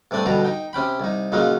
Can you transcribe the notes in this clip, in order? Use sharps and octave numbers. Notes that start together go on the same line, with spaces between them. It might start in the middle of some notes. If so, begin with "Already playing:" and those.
G2 C3 A3 D5 G#5 D#6
G2 B2 D3 G4 A#5
D#4 G5
C3 C#4 G5 B5
C2 D#4
A#2 C#3 F#3 G#3 C#4 D#4